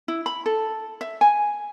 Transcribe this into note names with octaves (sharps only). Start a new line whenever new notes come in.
E4
B5
A4
E5
G#5